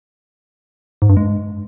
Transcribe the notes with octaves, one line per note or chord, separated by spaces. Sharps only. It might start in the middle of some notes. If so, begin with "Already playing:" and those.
G#2
G2
G#3